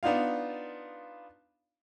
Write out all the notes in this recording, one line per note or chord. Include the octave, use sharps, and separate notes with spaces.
B3 D4 D#4 F4 F5